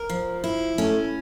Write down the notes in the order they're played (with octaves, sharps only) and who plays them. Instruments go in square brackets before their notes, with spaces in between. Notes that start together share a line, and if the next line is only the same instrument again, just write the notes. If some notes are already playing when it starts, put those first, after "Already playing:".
Already playing: [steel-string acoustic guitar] A#4
F3
E4
[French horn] A3 [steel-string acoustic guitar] C#4